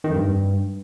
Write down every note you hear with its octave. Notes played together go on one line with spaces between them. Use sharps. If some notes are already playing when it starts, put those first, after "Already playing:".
D#3
F2
G2